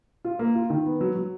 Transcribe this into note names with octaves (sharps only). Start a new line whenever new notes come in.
F4
A#3
F4
D#3
B3
F#3
F#3